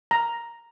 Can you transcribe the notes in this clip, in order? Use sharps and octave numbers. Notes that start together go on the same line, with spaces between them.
A#5